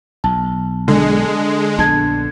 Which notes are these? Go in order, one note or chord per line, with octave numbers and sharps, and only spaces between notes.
B1 A5
D3 G#3
A#1 B3 D4 A5 G#6